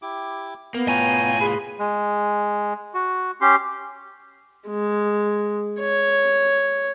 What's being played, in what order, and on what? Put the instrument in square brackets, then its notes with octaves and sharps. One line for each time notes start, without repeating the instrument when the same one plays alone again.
[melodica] E4 G4 D6
[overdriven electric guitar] A#3 [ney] B3
[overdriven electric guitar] A2 F4 [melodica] C#5 G5 A#5 [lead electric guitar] G#5
[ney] G#4 [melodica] B4 B5 C6
[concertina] G#3
F#4
C#4 G4 C6
[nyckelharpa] G#3
C#5